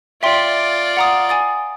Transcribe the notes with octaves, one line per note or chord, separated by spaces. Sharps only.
F4 D5 E5 G5 C6
F#5 A#5 D#6
G#5 D#6 A6